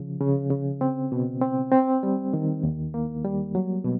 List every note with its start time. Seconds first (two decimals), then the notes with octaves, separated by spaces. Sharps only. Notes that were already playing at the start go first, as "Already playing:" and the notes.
Already playing: C#3 F3
0.21 C#3
0.50 C#3
0.81 C4
1.12 B2
1.41 C4
1.72 C4
2.03 G3
2.33 D#3
2.63 D#2
2.94 A#3
3.24 G3
3.55 F#3
3.84 B2